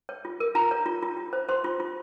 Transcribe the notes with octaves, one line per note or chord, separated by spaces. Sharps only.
C#5
F4
A#4
F4 A#5
C#5
F4
F4
F4
C5
C5 C6
F4
F4